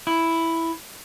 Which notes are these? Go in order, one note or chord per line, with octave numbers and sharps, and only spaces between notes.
E4